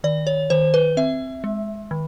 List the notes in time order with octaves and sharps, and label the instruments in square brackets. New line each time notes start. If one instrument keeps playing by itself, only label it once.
[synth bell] D#3 D5
C#5
D#3 C5
B4
C4 E5
G#3
D#3